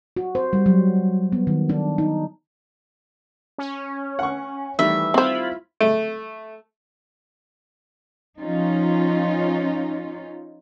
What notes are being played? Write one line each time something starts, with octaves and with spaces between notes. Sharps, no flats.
F#4
C5
G3
F#3
B3
D#3
D4
D#4
C#4
F#5 C#6
D#3 E3 G3 A3 E5
C4 E4 F4 C5 B5
A3
F3 C#4 D#4 F4